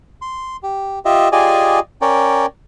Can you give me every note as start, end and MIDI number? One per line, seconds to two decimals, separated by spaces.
0.22 0.57 84
0.63 0.99 67
1.05 1.29 65
1.05 1.29 67
1.05 1.29 75
1.05 1.29 76
1.32 1.79 65
1.32 1.79 67
1.32 1.79 68
1.32 1.79 74
1.32 1.79 75
1.32 1.79 80
2.02 2.46 61
2.02 2.46 70
2.02 2.46 73
2.02 2.46 74
2.02 2.46 79